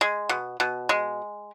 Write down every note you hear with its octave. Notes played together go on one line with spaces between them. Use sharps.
G#3
B2
B2
G#3